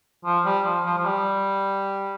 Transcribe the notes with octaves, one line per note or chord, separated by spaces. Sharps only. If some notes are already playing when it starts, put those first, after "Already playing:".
F3
G3
F3
F3
F3
G3